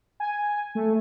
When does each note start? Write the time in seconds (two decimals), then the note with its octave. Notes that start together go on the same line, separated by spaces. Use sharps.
0.20 G#5
0.75 A3